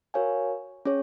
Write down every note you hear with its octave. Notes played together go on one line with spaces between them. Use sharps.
F#4 A#4 C#5 F5 G#5
C#4 G#4 C#5